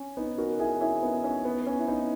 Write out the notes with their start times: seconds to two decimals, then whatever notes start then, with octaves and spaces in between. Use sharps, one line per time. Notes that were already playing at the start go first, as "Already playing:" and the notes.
Already playing: C#4
0.17 B3 D#4
0.38 F#4 A#4
0.59 E4 G#4
0.81 C#4 E4
1.02 B3 D#4
1.24 C#4
1.45 B3
1.62 B3
1.66 C#4
1.79 E4
1.87 B3 D#4